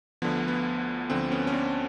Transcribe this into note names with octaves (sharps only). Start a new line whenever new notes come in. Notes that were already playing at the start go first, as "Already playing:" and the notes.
D2 D3 F3 B3
B3
D2 D3 F3 C4
B3 C#4
C#4
C4 D4